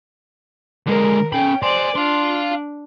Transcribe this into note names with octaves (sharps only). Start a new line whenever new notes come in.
D3 G#3 A#4
C#4 G5 B5
C5 D5 G#5 C6
D4 F5 C6